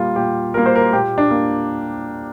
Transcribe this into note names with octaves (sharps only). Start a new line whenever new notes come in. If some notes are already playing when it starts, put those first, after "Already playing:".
Already playing: A#2 G3 A#3 F4
A#2 G4
G3 A#3 A#4
C5
A#4
A#2 G4
D4
A#3